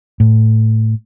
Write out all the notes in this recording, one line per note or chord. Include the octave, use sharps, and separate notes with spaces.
A2